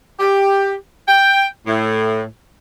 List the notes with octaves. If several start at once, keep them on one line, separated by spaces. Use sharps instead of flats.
G4
G5
A2